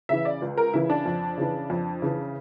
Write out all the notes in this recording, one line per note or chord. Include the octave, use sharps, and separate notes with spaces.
C#3 E3 E5
D5
C#2
A#4
C#3 E3 E4
D4
F2
C#3 E3
F2
C#3 E3